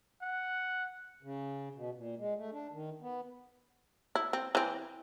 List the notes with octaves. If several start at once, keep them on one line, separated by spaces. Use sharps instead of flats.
F#5
C#3
B2
A#2
G#3
A3
D4
D#3
B3
E4
C4
E3 C4